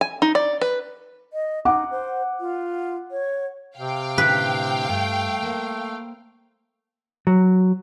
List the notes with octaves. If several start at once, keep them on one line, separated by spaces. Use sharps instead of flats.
G#5
D#4
D5
B4
D#5
D#4 F#5 D6
C5
F4
C#5
C3 F5 G5
A2 D3 B4
G2 A3
A#3 C5
F#3